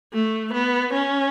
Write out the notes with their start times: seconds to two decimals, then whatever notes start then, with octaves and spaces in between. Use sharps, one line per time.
0.13 A3
0.53 B3
0.93 C#4